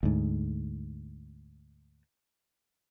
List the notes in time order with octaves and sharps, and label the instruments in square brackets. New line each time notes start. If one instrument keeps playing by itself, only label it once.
[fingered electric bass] D2 G#2